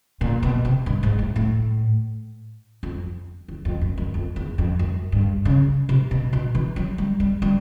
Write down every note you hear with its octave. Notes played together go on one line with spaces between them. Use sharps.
A#2
B2
C3
G2
G#2
A2
A2
F2
E2
F2
F#2
F#2
F2
E2
F2
F#2
G2
C#3
C3
B2
B2
E3
F#3
G3
G3
G3